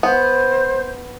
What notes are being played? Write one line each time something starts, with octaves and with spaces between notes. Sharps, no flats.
B3 C5